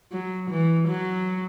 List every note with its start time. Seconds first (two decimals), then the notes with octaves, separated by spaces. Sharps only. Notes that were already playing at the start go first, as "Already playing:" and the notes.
0.12 F#3
0.50 E3
0.88 F#3